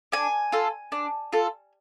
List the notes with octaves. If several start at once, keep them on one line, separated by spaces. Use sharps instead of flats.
D4 G#5
F4 A4
D4
F4 A4